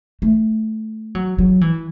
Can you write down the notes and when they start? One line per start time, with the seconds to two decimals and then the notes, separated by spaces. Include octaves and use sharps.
0.22 A3
1.15 F#3
1.39 F#3
1.61 E3